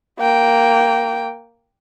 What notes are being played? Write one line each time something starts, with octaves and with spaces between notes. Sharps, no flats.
A#3 G5